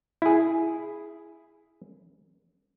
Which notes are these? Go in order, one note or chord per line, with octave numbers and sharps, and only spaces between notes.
E4 G#4